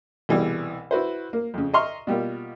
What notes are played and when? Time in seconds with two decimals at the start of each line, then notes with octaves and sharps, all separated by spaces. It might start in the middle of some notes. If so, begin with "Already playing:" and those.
0.29 C2 B2 E3 G3 G#4 D5
0.91 E4 F#4 B4 C5
1.33 A#3
1.54 F2 C#3
1.74 D#5 E5 A#5 C6 C#6 F6
2.07 B2 G3 A#3 F4